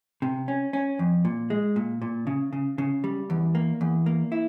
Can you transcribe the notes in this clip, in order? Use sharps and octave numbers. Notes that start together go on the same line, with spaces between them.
C3
C#4
C#4
F2
A#2
G#3
A#2
A#2
C#3
C#3
C#3
G3
E2
A#3
E2
A#3
E4